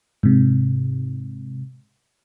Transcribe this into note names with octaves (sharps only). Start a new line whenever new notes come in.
G#2 C3